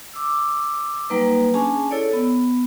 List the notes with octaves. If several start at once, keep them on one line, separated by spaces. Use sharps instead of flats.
D6 E6
F#3 G3 A#3 D#4 B4
C#4 D4 G#4 G#5 A5
E4 A4 C#5 D5
B3